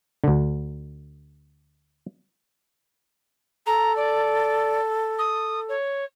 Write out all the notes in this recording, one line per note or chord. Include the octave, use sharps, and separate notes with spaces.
D2 D3
A4 A#5
D5
D#6
C#5